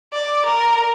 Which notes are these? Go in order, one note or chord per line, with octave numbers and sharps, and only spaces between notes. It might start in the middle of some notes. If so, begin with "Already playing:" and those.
D5
A#4